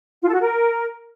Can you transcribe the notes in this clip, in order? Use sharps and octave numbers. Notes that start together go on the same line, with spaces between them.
F4
A4
F#4
A#4